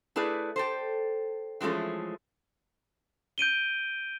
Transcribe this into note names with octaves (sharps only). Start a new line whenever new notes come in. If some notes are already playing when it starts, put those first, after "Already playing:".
A3 E4 G#4 B4 D5
G4 A4 C5
E3 F3 G#3 A3 C#4
G6 D7 D#7 G7